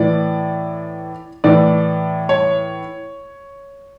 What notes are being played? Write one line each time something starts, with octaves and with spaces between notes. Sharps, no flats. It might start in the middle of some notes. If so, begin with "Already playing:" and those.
Already playing: A2 E3 D5
A2 E3 D5
C#5